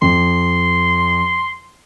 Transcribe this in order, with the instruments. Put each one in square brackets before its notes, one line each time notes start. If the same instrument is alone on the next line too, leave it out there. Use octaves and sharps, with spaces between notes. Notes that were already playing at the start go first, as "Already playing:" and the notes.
[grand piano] F2 [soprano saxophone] C6